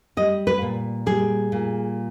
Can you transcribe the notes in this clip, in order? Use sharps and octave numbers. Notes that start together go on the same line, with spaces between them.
G3 D#5
B4
A#2
G3 G#4
A#2